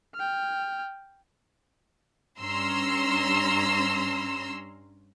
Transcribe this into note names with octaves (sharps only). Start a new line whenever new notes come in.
G5 F6
G2 C#4 A#5 C6 E6